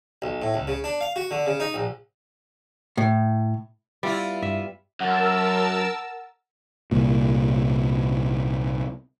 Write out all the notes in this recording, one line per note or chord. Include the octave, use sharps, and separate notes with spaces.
B1
A2
C#2
C#3
D4
F5
F#4
D3
C#3
D#4
A#1
A2
G3 B3 E4 F4
G2 E5
F#2 A#4 F#5 A5 E6
C2 A#2